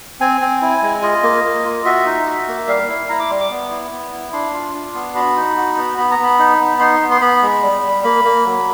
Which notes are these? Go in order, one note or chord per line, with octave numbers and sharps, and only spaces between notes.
C4 G#5
C4
E4
G#3
F4 D#5
A#3
A#3
F4
F#4 E5
D#4
F#4
A#3
G3 F5
E4
E4 A#5
D6
G3 C6
D6
B3
E4
B3
E4
D4 C6
F4
D4
B3
F#4 B5
D#4
F#4
B3
B3 B5
A#5
B3 B5
D#4
B3
D#4 C6
B3
C6
B3 B5
G#3
G3
G3
A#3 B5
A#3
F#3